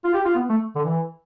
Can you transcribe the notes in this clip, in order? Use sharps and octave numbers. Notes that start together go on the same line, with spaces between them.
F4
G4
F4
B3
A3
D3
E3